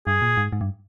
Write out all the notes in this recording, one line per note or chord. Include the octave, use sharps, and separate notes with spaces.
G2 G#4
A#2
G#2
G#2
G2